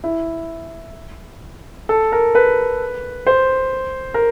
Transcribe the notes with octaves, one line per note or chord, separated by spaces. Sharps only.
E4
A4
A#4
B4
C5
A#4